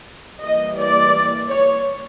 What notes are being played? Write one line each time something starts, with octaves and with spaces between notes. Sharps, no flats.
E3 G3 A#3 D#5
D5
C#5